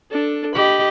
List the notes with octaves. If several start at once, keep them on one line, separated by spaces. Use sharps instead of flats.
D4 A4
G4 D#5 B5